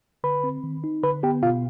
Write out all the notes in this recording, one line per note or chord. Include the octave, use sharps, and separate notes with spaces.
D3 B4 B5
C4
D#3
D#4
D3 B4 B5
B3 G4 G5
B2 F4 F5